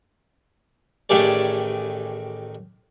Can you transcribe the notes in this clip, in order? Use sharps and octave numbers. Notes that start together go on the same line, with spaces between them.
A1 D#3 A3 G4 G#4 D5